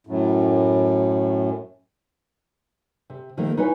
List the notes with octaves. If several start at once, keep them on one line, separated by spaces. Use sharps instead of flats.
F#2 A2
C3
C3 D#3 F3 A3 A#3
D#4 E4 B4 C#5 F5 G#5